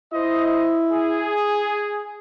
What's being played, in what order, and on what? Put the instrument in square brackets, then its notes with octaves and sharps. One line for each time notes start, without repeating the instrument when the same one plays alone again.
[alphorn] E4 [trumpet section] C5 D#5
[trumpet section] G#4